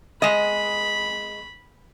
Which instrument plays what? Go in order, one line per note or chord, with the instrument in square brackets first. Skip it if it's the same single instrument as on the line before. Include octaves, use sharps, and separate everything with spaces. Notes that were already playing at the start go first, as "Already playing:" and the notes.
[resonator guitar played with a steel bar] G#3 D#5 [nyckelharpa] B5